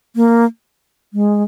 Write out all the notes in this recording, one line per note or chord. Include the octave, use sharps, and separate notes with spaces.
A#3
G#3